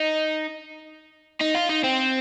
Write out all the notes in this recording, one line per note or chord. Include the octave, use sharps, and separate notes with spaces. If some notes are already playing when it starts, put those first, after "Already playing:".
Already playing: D#4
D#4
F4
D#4
C4